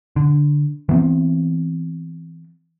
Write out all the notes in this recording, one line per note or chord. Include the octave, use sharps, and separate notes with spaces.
D3
E3 B3 C4